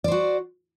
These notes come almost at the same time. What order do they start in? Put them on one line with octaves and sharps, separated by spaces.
D5 C5 F#4